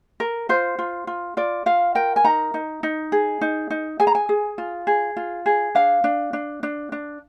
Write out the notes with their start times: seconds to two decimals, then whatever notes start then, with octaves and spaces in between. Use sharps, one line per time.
0.20 A#4
0.49 F4 C5
0.79 F4
1.07 F4
1.37 F4 D5
1.66 F4 F5
1.95 A#4 G5
2.16 G#5
2.24 D#4 A#5
2.54 D#4
2.83 D#4
3.12 G#4
3.41 D#4
3.70 D#4
4.00 G#4 G#5
4.07 A#5
4.15 G#5
4.29 G#4
4.58 F4
4.87 G#4
5.17 F4
5.46 G#4
5.75 D4 F5
6.04 D4
6.33 D4
6.63 D4
6.92 D4